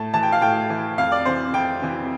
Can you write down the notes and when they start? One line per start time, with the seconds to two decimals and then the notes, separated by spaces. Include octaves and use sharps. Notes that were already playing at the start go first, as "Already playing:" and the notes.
Already playing: A2 A5
0.14 E3 A5
0.23 G5
0.32 F5
0.41 A2 G5
0.70 E3
0.98 F2 F5
1.12 D5
1.25 C3 E3 C5
1.54 F2 G5
1.82 C3 E3